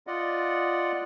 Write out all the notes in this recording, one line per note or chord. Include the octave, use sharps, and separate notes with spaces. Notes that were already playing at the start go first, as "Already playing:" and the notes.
F4 D5 D#5 F#5